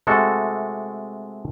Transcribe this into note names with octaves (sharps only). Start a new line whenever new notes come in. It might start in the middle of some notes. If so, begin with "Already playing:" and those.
C3 G#3 A3 F#4 A4